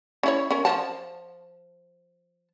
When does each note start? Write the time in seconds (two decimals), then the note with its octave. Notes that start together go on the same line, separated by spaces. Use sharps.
0.23 C#4 E4 C#5
0.51 C#4 A#4
0.65 F3 A5